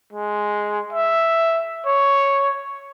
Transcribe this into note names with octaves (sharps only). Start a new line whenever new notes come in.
G#3
E5
C#5